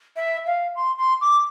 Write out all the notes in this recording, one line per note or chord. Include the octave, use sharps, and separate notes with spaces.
E5
F5
C6
C6
D6